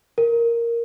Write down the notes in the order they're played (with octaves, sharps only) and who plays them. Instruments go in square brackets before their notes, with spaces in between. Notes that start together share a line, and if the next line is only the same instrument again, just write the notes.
[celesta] A#4